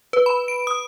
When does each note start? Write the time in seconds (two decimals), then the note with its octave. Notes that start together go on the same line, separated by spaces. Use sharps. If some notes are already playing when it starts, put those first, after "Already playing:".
0.13 B4
0.26 B5
0.48 D7
0.67 D#6